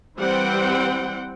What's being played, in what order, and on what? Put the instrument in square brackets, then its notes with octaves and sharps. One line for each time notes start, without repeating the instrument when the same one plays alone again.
[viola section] E3 G3 C4 C5 F#5 G5